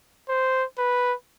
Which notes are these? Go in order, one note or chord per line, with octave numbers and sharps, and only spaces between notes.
C5
B4